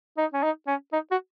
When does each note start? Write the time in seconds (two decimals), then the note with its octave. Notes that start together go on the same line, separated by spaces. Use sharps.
0.18 D#4
0.33 C#4
0.43 D#4
0.67 C#4
0.93 D#4
1.11 F#4